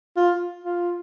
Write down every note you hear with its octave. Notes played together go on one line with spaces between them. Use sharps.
F4
F4